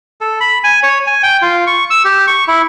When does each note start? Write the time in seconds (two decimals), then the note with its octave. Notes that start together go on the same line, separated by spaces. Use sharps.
0.21 A4
0.40 B5
0.64 G#5
0.83 C#5
1.07 G#5
1.23 G5
1.42 F4
1.67 C#6
1.90 E6
2.05 G4
2.27 C#6
2.48 E4